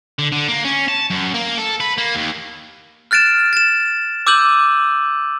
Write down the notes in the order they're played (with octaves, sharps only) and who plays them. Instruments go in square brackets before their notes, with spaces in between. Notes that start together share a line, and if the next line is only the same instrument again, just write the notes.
[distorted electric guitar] D3
D3
A#3
C#4
A5
F#2
A#3
A4
B4
A#3
D#2
[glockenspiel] F6 F#6 A6 D7 E7
A6 E7
D6 E6 F#6 G6 D#7 F#7